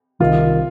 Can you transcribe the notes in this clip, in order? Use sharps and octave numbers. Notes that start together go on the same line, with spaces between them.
C2 C3 D#3 F4